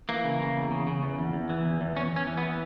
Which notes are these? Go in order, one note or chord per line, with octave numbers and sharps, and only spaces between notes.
E3 A#3
C#3
C#3
E2
C#3
C#3
E2
E2
E2
E3
E2
E2
E2 C#4
E2 C#4
E3
B3
E3